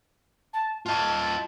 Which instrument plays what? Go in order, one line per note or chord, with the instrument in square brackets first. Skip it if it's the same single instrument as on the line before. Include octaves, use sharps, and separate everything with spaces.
[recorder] A5
[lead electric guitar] F4 D#5 [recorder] A5